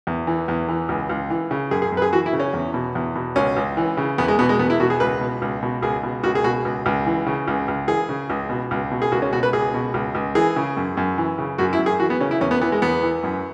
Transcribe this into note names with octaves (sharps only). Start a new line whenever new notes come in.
E2
E3
E2
E3
C#2
C#2
E3
C#3
F#2 G#4
G#4
F#2
B4
G#4
E3 F#4
E4
C#3
C#4
E2
B2
E2
B2
C#2 C#4
C#2
E3
C#3
E2 B3
G#3
B2 B3
G#3
E2 B3
E4
B2 F#4
G#4
C#2 B4
B2
C#2
B2
C#2 G#4
B2
C#2 F#4
G#4
B2 F#4
C#2
C#2
E3
C#3
C#2
C#2
E3 G#4
C#3
C#2
B2
C#2
B2
G#4
C#2 F#4
C#4
B2 F#4
B4
C#2 G#4
B2
C#2
C#2
E3 G#4
C#3
F#2
F#2
E3
C#3
F#2 F#4
E4
F#2
G#4
E3 F#4
B3
C#3 C#4
E4
E2 C#4
B3
E3 B3
G#3
E2 B3
E3
F#2